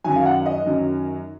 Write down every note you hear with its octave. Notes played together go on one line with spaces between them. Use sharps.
F#2 D#3 F#3 G#5
F5
F#5
D#5
F#2 D#3 F#3